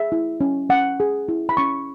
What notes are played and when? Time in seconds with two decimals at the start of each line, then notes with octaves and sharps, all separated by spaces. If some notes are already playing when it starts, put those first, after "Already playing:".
Already playing: G#4 E5
0.12 E4
0.41 C#4
0.70 C#4 F#5
1.00 G#4
1.29 E4
1.49 B5
1.57 C#4 C#6